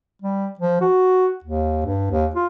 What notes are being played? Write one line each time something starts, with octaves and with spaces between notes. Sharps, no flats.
G3
F3
F#4
D#2
G2
D#2
F4